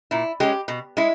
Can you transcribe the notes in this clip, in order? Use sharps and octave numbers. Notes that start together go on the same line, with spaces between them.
A#2 E4
G#3 C#4 G4
B2
G#3 E4